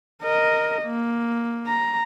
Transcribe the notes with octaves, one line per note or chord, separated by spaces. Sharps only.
A#4 D#5
A#3
A#5